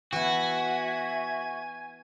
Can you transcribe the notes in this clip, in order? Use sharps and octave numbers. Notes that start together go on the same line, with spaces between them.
E3 B3 F#4 E5 G#5